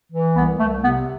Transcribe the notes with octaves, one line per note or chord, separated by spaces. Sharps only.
E3
C2 B3
C2 A3
C3 B3